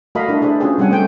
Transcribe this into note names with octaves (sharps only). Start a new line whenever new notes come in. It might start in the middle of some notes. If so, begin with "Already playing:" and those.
A3 F#4 A#4 D#5 F5 B5
D4 E4
D4 G#4 A4 C5
C#4 F4 F#4 G#4 B4 G5
G3 C4 C#4 F#5 G#5
A3 C5 G5